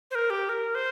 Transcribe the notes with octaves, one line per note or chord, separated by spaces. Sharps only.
C5
A#4
G4
A#4
C5